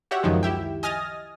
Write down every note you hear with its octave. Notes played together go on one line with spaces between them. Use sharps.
F#4 G4 C#5 E5 F#5
C#2 F#2 D#3 F3 G#3
E4 G4 E5 G5
D#5 G#5 D#6 F6 A6 A#6